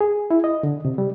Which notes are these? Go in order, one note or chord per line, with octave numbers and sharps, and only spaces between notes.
G#4
E4
D#5
D3
C3
G3